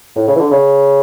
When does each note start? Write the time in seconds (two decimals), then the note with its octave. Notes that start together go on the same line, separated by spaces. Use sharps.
0.16 A2
0.28 C#3
0.35 E3
0.39 D3
0.51 C#3